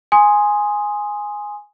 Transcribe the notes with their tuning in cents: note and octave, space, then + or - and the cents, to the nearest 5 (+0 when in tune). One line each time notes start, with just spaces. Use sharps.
G#5 +0 C6 +5 D#6 +0